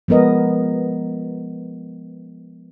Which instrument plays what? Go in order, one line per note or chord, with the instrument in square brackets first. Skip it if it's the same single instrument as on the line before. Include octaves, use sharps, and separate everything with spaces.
[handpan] F3 G#3 B3 A#4 D#5